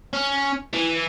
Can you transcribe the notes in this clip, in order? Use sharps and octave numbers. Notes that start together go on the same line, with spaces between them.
C#4
E3